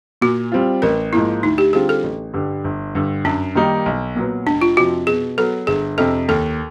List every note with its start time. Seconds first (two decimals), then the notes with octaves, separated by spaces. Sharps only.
0.22 A#2 F#4
0.52 G3 C4 F4
0.82 A1 A#4
1.13 G#2 F3 A#3 E4
1.43 D2 D#4
1.58 G4
1.73 D3 G3 C4 F4 G#4
1.89 A4
2.03 A1
2.34 G2 D3 G3
2.64 G1
2.95 G2 D3
3.24 F#2 D4
3.55 D#3 G3 A#3 D#4
3.86 B1
4.16 A#2 F#3 B3
4.46 F1 D4
4.61 F4
4.77 F2 C3 F3 F#4
5.07 B2 G#4
5.37 F#3 B3 A4
5.67 G1 G#4
5.98 F2 C3 A4
6.28 D#2 A4